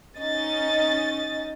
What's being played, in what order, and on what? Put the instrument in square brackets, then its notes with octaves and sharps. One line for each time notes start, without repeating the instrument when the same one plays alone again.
[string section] C#4 D#4 D#5 A6